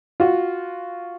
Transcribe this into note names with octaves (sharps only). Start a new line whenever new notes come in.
F4 F#4